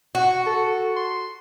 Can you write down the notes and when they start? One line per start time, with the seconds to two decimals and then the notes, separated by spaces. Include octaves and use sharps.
0.15 F#4
0.46 A4
0.96 C6